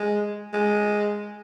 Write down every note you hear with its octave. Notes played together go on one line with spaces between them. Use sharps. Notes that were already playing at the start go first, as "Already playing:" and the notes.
Already playing: G#3
G#3